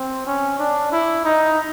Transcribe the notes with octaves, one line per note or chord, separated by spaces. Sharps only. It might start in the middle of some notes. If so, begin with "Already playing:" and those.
Already playing: C4
C#4
D4
E4
D#4